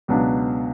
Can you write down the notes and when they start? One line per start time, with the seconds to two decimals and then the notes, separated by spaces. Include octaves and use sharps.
0.08 C#2 B2 F#3 B3 D4